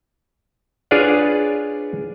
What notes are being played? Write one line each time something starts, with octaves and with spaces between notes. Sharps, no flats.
D4 F4 G#4 B4 C#5 D5